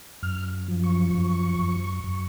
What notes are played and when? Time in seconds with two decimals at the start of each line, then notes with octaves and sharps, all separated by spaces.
0.22 F#2 F6
0.68 F3
0.84 C#6
1.14 F#2
1.59 F#2
2.04 F#2